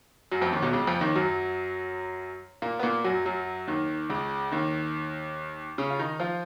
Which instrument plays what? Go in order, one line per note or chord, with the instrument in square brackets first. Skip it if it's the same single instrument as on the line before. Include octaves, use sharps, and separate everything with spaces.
[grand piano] F#2 F#3
F2 F3
D#2 D#3
B1 B2
C#2 C#3
F2 F3
D#2 D#3
F#2 F#3
A#2 A#3
B3
A#2 A#3
F#2 F#3
F#2 F#3
D#2 D#3
C#2 C#3
D#2 D#3
C#3 C#4
F4
D#3 D#4
F3 F4